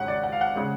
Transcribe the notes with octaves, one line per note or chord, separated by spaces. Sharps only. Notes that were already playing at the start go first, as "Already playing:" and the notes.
Already playing: G#1 G#2 C#4 F#5
D5
F#5
F5
F#5
C#3 G#3